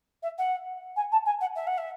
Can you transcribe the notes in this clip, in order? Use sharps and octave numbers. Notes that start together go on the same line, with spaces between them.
E5
F#5
G#5
A5
G#5
F#5
E5
F#5
E5